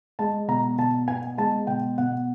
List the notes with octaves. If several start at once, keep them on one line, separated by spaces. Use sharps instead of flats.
G#3 A5
B2 A#5
B2 A5
B3 G#5
G#3 A5
B2 G5
B2 F#5